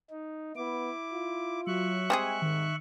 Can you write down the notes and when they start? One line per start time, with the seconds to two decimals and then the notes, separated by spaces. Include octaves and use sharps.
0.10 D#4
0.56 B3 E4 D6
1.13 F4
1.67 F#3 E5 C#6 F#6
2.10 G3 G#3 C4 G#4 G#5
2.42 G#2 D#3